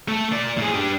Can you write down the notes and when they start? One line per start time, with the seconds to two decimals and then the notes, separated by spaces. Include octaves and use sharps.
0.08 A3 A4
0.32 A#3 D5
0.57 A2 G#4
0.74 D4 G4